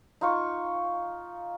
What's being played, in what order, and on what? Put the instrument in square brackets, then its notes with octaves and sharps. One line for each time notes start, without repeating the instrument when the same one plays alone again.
[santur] D#4 F4 C#6